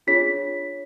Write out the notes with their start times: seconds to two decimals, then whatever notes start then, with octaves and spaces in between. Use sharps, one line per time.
0.07 D4 F4 G#4 C#5 B6